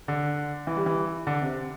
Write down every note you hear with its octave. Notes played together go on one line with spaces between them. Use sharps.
D3
E3
G3
E3
D3
C3